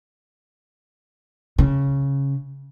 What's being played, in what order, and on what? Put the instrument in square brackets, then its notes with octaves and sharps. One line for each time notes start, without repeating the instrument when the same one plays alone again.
[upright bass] C#3